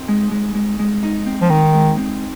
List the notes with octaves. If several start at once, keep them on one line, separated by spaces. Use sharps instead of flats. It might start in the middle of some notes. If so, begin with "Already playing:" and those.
Already playing: C4 D#4
G#3
G#3
G#3
G#3
D#4
C4
F3
D#3 D#4
G#3
C4